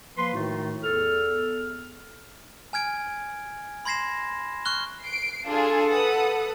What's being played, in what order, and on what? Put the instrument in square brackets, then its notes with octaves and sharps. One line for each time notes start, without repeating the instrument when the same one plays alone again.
[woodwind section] F3 A#3 B4 C6
A2 D#3 A3 D#4 F4 F#4
E2 A4 F6
[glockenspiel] G#5 F6 G#6 D7
B5 C6 G#6 A#6 C7 E7
C#6 F6 F#6 G7
[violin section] C7 D7
[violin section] D4 F4 G#4 [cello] A4
[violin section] B4 F#5 D#6